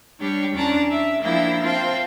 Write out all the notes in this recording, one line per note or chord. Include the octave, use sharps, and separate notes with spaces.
G3 D4 G4 C#5
E2 C#4 D4 D5 A5 A#5
E5
F3 A#3 D4 E4 G5 E6
C4 F4 C5 F5 G5 A5